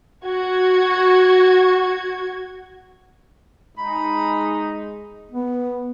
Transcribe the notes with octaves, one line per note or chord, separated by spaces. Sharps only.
F#4 G#6
G#3 D#4 B5
B3